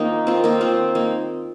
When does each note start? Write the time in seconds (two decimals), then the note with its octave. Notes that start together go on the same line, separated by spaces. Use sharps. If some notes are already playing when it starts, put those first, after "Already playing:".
Already playing: D#3 A#3 C4 D#4 F4
0.27 C4 F4
0.44 A#3 D#4
0.61 C4 F4
0.95 A#3 D#4